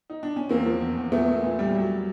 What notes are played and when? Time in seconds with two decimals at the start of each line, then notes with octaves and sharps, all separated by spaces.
0.10 D#4
0.23 D4
0.36 C#4
0.49 E2 A#3 C4
0.66 F3
0.81 E2
0.97 E2
1.12 A#2 A3 B3
1.28 A#2
1.44 A#2
1.59 G3
1.75 F#3